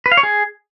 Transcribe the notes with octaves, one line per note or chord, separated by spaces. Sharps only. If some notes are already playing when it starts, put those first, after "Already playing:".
B4
F5
C#5
G#4